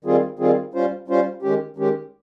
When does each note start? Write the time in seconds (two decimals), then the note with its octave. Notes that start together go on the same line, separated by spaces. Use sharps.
0.04 D#3 G3 C4 F4 G#4
0.39 D#3 G3 C4 F4 G#4
0.74 G3 C#4 F4 C5
1.08 G3 C#4 F4 C5
1.42 D#3 G#3 C#4 G4
1.77 D#3 G#3 C#4 G4